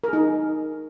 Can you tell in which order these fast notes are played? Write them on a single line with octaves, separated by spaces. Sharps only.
A#4 G#4 D#4